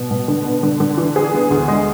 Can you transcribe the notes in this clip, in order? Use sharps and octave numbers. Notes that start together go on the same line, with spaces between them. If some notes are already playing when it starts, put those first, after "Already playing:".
Already playing: B2
B2
D3
B3
D3
D3
E3
G#4
B3
D2
G#3